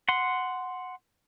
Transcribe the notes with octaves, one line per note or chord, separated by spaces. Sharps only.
F#5 C6